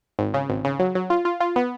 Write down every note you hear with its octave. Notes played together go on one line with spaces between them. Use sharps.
G#1
C#3
G#1
C#3
F#3
F#3
F4
F4
F4
B3